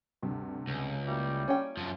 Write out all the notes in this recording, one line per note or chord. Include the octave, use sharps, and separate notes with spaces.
D2 G2 C3
C#2
G3 A#3 E4 F#4
C#4 G5
F#2 F3